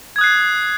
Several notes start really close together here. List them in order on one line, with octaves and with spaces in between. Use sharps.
G#6 D#6 F#6 C7